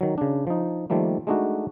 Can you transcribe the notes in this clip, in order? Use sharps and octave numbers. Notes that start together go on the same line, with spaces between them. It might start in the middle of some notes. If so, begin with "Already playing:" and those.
D#3 F#3
C#3 D4
F3 D#4
D#3 F3 G3 A3 A#3
G#3 A3 D4 D#4 F#4